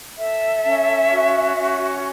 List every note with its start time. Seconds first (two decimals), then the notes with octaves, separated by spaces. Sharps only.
0.17 A4 E5
0.63 C#4
1.11 F#4
1.57 C#4